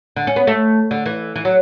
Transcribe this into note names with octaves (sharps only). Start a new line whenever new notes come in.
D3
C#4
B3
A3
D3
E3
E3
F#3